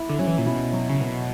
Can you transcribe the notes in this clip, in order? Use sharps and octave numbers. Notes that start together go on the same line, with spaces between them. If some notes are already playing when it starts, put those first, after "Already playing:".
Already playing: E4
D3
F#3 C#4
E3
A#2
B2 E4
F#3
C#3
B2 B3